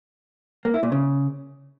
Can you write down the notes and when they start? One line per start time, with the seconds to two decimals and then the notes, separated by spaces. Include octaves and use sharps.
0.65 A#3
0.74 E4
0.83 A#2
0.92 C#3